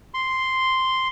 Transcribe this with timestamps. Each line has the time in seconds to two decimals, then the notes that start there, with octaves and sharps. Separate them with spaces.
0.14 C6